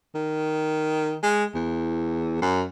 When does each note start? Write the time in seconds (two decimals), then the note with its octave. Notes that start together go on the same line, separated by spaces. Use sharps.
0.15 D#3
1.23 G#3
1.54 E2
2.42 F#2